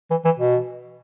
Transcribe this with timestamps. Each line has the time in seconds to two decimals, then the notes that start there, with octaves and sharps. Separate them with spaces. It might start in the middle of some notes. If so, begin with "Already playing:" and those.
0.10 E3
0.25 E3
0.39 B2